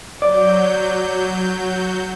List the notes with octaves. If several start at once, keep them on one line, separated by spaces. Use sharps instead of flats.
F#3 D5 G6